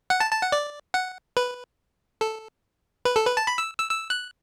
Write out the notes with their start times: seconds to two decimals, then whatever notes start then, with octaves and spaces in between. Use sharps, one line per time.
0.10 F#5
0.20 A5
0.31 A5
0.42 F#5
0.52 D5
0.94 F#5
1.37 B4
2.21 A4
3.05 B4
3.16 A4
3.26 B4
3.37 A5
3.47 B5
3.58 E6
3.79 E6
3.90 E6
4.10 F#6